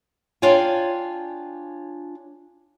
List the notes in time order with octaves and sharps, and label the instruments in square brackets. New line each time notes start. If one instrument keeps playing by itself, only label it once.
[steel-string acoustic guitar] D4 F4 C#5 G5 G#5